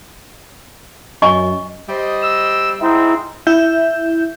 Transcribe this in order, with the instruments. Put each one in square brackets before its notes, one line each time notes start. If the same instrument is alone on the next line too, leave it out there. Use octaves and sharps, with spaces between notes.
[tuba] F#2 [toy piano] D#5 G#5 C#6
[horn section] G3 C5 D#5
[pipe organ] E6
[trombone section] G#2 C4 D#4 [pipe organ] E4
[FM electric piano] E4 E5 G6